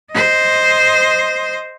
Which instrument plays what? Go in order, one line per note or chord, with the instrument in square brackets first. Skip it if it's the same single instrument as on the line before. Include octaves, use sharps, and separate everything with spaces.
[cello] C5 D#5